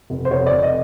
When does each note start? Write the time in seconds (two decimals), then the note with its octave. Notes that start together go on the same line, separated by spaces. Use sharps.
0.10 F1
0.25 C5
0.31 F1 C#5
0.47 F1 D5
0.63 D#5